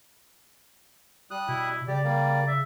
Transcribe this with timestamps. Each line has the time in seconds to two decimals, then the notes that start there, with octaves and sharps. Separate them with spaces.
1.31 G3 D#6 F#6
1.48 B2 E4
1.88 C#3 G3 G4 D5
2.04 G3 A#3
2.48 E5